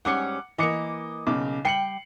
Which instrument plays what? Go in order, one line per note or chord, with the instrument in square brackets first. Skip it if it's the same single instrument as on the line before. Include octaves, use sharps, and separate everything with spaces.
[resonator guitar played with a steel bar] G#2 G3 C#4 [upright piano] F#5 D6 C#7
[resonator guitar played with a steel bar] E3 A#3 [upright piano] D#5 D6 C#7
[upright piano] B1 C#3 D6
[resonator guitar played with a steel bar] G3 G5 [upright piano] C7 C#7 F#7